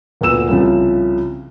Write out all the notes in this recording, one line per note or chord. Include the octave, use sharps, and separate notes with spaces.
D2 A#2 B3 E6 E7
C2 C#3 F3